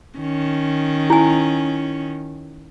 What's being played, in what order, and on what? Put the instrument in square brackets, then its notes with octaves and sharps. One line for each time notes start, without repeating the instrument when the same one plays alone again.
[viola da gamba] D#3 C#4
[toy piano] E4 G#5